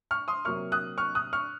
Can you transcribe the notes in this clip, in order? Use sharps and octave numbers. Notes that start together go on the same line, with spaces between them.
C#6 F6
C6 D#6
C3 F#3 A#3 C#6 F6
D#6 F#6
C#6 F6
D#6 F#6
C#6 F6